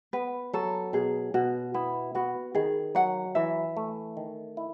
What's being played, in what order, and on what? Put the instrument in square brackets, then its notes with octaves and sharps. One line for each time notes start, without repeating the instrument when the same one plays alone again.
[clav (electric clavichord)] B3 [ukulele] B4
[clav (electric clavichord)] F#3 [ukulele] A4
[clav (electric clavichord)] B2 [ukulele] G#4
[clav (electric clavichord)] B2 [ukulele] F#4
[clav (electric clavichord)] B3 [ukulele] E4
[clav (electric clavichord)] B3 [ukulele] F#4
[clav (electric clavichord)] D#3 [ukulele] G#4
[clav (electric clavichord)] F#3 [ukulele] F#5
[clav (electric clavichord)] E3 [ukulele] E5
[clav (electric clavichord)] A3
D#3
E4